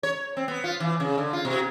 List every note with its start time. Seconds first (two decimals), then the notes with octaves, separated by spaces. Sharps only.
0.03 C#5
0.37 C4
0.48 B3
0.64 F4
0.80 E3
1.00 C#3
1.18 D3
1.33 F4
1.45 B2